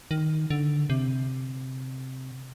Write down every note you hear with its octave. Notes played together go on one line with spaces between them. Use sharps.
D#3
D3
C3